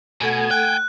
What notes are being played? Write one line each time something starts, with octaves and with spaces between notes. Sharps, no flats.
B2 A3 A4 F#5 G#5
G5 F#6